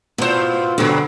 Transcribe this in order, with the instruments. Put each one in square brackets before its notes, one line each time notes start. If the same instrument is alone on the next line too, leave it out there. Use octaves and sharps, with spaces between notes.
[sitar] G#2 C5 [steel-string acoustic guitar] B2 F4
[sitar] F#2 F#3 [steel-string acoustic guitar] B2 D3